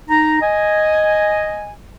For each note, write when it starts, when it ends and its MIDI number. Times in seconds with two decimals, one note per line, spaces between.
0.09 0.40 63
0.09 0.40 82
0.41 1.72 75
0.41 1.72 80